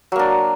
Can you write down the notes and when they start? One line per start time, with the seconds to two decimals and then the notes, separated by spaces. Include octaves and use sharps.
0.12 F#3
0.16 A#3
0.19 D4